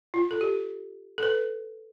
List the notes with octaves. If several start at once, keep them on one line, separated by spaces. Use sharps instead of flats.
F4
A4
G4
A4
B4